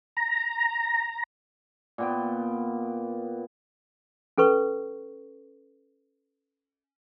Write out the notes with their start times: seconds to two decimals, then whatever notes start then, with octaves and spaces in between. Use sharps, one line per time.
0.17 A#5
1.98 A#2 B3 G5
4.38 C#4 A4 B4 C#6